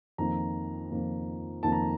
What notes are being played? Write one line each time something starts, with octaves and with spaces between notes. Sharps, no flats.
F2 D#3 A#3 A#5
F2 D#3 A#3
F2 D#3 A#3 A5
A#5